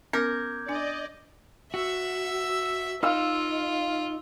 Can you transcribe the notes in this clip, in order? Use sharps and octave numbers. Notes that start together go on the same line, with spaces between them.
B3 C#4 A#4 D6 G6 G#6
D4 D5 D#5 G#5
F#4 E5 E6
D#4 F4 F5 E6